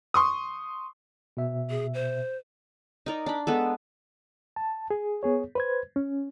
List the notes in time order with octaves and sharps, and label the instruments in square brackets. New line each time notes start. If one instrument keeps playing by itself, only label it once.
[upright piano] C6 C#6 D#6
[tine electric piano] B2 E5
[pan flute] G#4
C5
[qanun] D#4 A#4 D5
D4 B5
G#3 B3 A4
[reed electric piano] A5
G#4
B3 G#4 C#5
B4 C5 G#6
C#4